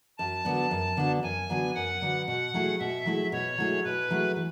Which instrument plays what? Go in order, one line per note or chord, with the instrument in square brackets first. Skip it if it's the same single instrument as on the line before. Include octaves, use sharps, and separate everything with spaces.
[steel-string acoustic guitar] F#2 [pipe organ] A5
[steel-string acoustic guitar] D3 F#3 B3 D4
F#2
D3 F#3 B3 D4
[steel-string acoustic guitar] F#2 [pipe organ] G#5
[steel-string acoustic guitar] D3 F#3 B3 D4
[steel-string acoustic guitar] F#2 [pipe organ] F#5
[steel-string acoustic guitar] D3 F#3 B3 D4
[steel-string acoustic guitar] B2 [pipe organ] F#5
[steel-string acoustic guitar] F#3 A3 E4 G#4
[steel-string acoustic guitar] B2 [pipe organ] E5
[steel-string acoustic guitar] F#3 A3 E4 G#4
[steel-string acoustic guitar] B2 [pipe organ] C#5
[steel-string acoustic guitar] F#3 A3 E4 G#4
[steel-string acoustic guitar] B2 [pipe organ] B4
[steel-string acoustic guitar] F#3 A3 E4 G#4
E3